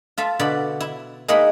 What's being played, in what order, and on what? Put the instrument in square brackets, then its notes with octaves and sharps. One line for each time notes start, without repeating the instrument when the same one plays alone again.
[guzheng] F4 A4 E5
B2 D3 D5 F#5 B5
E4
G#3 A#3 D#4 A#4 F#5 B5